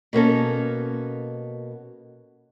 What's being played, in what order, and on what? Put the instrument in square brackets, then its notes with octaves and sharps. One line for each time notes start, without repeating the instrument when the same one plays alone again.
[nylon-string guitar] B2 A#3 C#4 A4